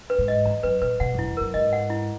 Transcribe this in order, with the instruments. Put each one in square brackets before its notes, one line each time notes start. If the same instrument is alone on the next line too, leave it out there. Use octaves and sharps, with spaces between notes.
[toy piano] B4
[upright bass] G#2
[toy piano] D#5
[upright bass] E2 [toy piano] A#5
[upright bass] F#2 [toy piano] B4
[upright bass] A#2 [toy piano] B4
[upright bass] B2 [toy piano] F#5
[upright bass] F#2 [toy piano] E4
[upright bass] E2
[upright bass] F#2 [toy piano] A#4
[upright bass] G#2 [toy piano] D#5
[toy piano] F#5
E4